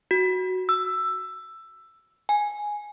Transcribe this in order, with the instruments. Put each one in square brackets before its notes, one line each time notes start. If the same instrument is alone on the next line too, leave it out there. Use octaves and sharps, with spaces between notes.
[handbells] F#4
E6
G#5